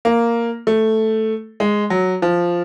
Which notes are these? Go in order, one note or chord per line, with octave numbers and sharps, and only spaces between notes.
A#3
A3
G#3
F#3
F3